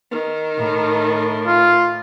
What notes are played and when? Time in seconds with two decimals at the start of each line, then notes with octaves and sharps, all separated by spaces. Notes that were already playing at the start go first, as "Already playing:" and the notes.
0.11 D#3
0.58 A2
1.46 F4